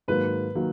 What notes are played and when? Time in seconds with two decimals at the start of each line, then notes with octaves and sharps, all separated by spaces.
0.08 G#2 D#3 F#3 A#3 B4
0.55 D#3 F#3 A#3